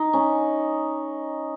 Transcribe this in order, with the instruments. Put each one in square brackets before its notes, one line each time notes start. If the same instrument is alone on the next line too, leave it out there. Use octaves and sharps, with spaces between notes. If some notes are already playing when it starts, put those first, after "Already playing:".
Already playing: [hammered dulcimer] D#4
C#4